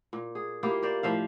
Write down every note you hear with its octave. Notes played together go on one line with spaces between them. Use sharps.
A#2
G#4
A#3 E4 F4 G4
A#4 C5 D5
A2 F3 E5 F5